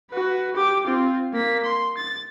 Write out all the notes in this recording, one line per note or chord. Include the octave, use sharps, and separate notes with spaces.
F#4 B4
G4 D6
C4 F4
A#3 B6
C6
A6